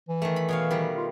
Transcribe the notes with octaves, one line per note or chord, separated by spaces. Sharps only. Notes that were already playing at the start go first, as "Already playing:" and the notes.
E3
D#3 A3
B5
B2 C#5 F5
D#3 G3 B4
F4